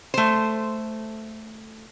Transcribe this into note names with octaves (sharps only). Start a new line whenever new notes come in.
A3 C5